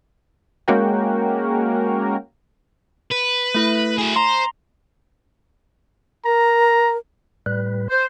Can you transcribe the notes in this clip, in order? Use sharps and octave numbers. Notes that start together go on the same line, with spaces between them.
G#3 A#3 C#4 F#4 A#4 G5
B4
A3 E4
F#4 G#4
C5 A#5 C6
A#4 A#5
A2 G3 B4
C5